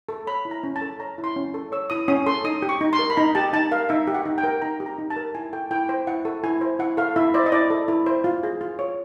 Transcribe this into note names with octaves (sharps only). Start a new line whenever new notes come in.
A4
C#5 B5
E4
A#5
C#4
A5
A4
C#5 A#5
E4
C6
C#4
A4
C#5 E6
E4 D#6
C#4 D#6
A4 C6
D#4 D#6
G4
C#6
D#4
C6
A#4
B5
D#4 A#5
G4 A5
D#4 A5
A#4 F5
D#4 E5
G4
F#5
D#4
G5
A#4
D#4 A#5
G4
A#5
D#4
A5
A#4
E4 G#5
A4 G5
E4 G5
C5 G5
E4 F#5
A4
E4 G#5
C5
E4 F#5
A4 F5
E4 E5
C5 D5
D#5
E4 D5
A4
E4
C5
F4
G#4
F4
C#5